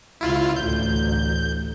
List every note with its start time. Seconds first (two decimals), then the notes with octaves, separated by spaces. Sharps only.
0.21 C#2 E4 F4
0.56 A1 D2 G6